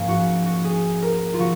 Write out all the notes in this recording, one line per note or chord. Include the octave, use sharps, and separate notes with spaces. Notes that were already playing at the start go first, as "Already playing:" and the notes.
Already playing: G#2 F3 A#3 C#4
F#4
F#4
G#4
A#4
F4
F3 F#4